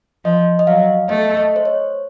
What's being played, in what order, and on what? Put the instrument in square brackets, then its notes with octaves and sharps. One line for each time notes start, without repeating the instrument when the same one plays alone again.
[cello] F3 [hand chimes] D#5
[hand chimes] D#5
[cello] F#3 [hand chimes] F5
[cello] A3 [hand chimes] D#5
[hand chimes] D#5
C5
C#5